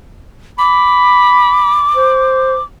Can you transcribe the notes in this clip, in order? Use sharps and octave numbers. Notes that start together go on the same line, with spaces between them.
B5 D6
C5